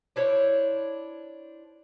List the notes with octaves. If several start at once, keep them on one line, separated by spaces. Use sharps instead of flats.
D4 E4 C5 C#5